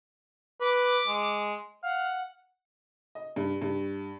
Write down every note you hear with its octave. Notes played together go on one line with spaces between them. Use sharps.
B4 D6
G#3
F5 F#5
D#5
G2
G2